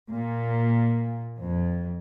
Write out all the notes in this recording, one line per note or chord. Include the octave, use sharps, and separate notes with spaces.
A#2
F2